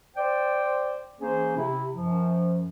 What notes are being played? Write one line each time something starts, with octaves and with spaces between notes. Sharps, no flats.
C5 D5 G5
E3 A#3 C#4 G#4 C5
C3 E4
F#2 F3